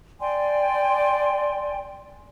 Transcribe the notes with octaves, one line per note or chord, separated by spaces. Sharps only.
D5 G5 G#5 C6